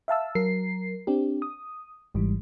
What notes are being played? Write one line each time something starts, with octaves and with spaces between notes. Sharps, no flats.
E5 F5 A5 E6
F#3 A#4 C7
C4 D4 G4
D#6
G#1 G#2 E3 G3